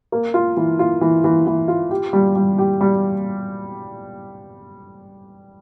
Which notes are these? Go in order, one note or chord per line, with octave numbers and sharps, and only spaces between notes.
A#3
F4
E3
F4
E3
E3
E3
F4
G4
G3
G3
G4
G3